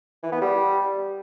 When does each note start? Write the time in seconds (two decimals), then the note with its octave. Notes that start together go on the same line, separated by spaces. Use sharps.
0.23 E3
0.32 B3
0.41 G3